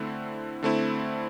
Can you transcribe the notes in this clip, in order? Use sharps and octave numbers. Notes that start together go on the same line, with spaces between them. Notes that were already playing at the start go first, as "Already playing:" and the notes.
Already playing: D3 A3 C4 E4
D3 A3 C4 E4